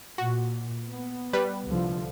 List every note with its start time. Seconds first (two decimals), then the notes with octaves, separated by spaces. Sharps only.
0.18 A#2 F#4
0.90 B3
1.33 G3 B4
1.66 C2 D3 F3